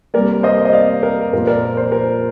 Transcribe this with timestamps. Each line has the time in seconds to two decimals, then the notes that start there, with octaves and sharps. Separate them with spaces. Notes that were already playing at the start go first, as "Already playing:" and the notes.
0.14 C3 G3 A#3 A#4 D5
0.43 C5 D#5
0.65 D#5
0.73 D5 F5
1.03 A#4
1.33 A#2 F3 A#3 A#4
1.47 A#4 D5
1.77 C5
1.92 A#4